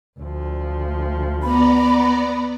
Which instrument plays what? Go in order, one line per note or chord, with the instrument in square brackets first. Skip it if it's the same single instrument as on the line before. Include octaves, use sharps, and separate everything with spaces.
[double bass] D2 F3
[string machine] B3 D5 A#5 [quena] B5